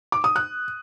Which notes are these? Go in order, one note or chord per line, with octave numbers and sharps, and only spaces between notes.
D6
D#6
F#6